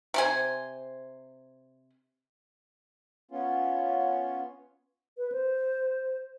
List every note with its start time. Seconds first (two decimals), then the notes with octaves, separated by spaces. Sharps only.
0.14 C3 C5 G#5
3.31 B3 C#4 F4
5.18 B4
5.32 C5